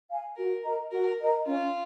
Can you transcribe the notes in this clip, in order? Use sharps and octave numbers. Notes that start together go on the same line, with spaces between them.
F5 G#5
F#4 A#4
A#4 D#5 A#5
F#4 A#4
A#4 D#5 A#5
C#4 F4